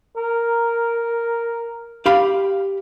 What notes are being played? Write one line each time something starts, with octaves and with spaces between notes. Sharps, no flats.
A#4
G4 F5 B5